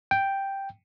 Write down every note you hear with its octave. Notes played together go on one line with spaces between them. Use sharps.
G5